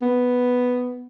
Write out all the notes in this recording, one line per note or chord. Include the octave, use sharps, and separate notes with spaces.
B3